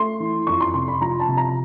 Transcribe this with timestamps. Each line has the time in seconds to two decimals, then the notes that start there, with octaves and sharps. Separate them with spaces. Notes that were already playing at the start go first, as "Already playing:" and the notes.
Already playing: A3 C6
0.20 E3
0.47 F2 C#6
0.61 C6
0.74 C3 C6
0.88 B5
1.01 F3 A#5
1.20 A5
1.28 C3
1.37 A#5